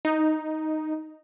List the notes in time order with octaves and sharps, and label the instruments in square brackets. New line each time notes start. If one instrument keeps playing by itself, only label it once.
[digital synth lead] D#4